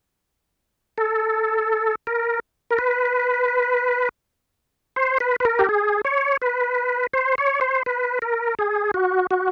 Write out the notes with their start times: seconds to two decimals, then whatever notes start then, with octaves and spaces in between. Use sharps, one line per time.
0.98 A4
2.07 A#4
2.71 A#4
2.79 B4
4.96 C5
5.20 B4
5.40 B4
5.45 A#4
5.59 G4
5.69 G#4
6.05 C#5
6.42 B4
7.13 C5
7.38 C#5
7.61 C5
7.86 B4
8.22 A#4
8.59 G#4
8.94 F#4
9.31 F#4